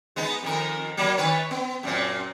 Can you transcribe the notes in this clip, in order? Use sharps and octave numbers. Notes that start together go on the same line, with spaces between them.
G#3 B3 D#4
F2 D#3 A#4
F#3 A#3
D#3 B4 C#5
B3
F#2 A#2 C4